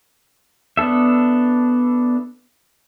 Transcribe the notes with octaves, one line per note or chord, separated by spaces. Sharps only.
B3 D4 A4 E5